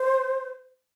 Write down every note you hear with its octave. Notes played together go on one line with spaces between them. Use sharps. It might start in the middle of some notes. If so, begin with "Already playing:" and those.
Already playing: C5